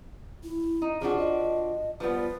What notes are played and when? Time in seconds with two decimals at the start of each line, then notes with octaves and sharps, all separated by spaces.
0.44 E4
0.82 D#4
1.01 F3 D4 F#4 G#4
1.18 D#5
2.00 F3 G3 B3 B4